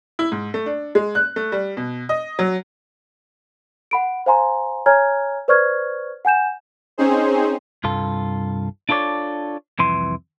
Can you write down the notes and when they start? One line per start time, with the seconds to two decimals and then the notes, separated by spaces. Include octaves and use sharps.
0.19 E4
0.32 G#2
0.54 A3
0.66 D4
0.95 G#3
1.15 F#6
1.36 A3
1.52 G3
1.77 B2
2.09 D#5
2.39 F#3
3.91 F#5 B5 D7
4.26 C5 F5 G#5 A#5 C6
4.86 C#5 G#5 A#5 F6 G#6
5.48 B4 C5 D5 C#6 F6 G#6
6.25 F#5 G#5 G6 E7
6.98 C4 C#4 D#4 G#4 C5
7.84 C2 G2 F4 A4
8.89 D4 F4 A4 C#5 D5
9.79 C2 F2 E3 C6